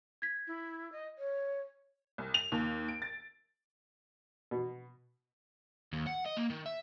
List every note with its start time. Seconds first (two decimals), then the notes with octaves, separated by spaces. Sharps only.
0.22 G#6 B6
0.47 E4
0.92 D#5
1.18 C#5
2.18 C2
2.34 F7
2.52 D#2
2.88 D7
3.02 A6
4.51 B2
5.93 D#2
6.07 F#5
6.26 D#5
6.37 A#3
6.50 D#3
6.66 E5